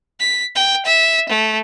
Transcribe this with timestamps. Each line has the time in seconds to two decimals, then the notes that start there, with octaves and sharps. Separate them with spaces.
0.20 B6
0.55 G5
0.86 E5
1.29 A3